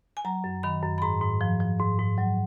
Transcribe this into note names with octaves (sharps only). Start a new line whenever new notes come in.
G#5
F#3 A#5
F#2
D#3 B5
F#2
B5
G#2 A#5
G#2
F3
F3
G#2
G#2
F#3